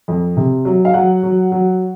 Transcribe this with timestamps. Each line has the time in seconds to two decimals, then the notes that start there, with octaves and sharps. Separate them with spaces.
0.08 F2
0.37 C3
0.65 F#3
0.85 F5
0.94 F#3 F#5
1.23 F#3
1.52 F#3